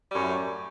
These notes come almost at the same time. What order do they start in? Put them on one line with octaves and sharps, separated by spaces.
G3 F#2 A2